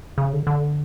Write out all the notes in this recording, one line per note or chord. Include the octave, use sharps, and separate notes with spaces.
C#3
D3
D3